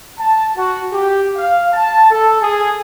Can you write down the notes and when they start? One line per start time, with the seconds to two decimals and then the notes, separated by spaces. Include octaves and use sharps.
0.19 A5
0.56 F#4
0.91 G4
1.36 F5
1.73 A5
2.10 A4
2.41 G#4